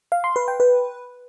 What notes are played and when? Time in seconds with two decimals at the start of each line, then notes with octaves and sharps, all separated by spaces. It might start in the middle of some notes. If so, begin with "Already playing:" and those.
0.12 F5
0.24 C6
0.36 B4
0.48 G5
0.60 B4